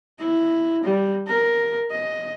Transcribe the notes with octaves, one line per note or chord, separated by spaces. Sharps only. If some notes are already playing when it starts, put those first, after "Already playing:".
E4
G3
A#4
D#5